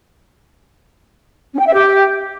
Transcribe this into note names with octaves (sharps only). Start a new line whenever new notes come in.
C#4
G5
E5
G4